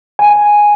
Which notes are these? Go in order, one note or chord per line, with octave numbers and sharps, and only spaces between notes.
G#5